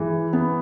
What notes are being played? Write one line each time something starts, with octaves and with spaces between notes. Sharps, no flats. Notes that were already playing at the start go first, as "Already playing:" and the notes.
Already playing: E3 G#3
B3